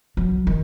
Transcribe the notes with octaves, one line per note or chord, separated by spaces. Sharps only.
F#3
D#3